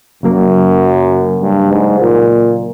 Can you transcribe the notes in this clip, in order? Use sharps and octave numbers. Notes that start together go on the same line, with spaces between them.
F#2 C#3 F#3 A#3
G2
G#2
A#2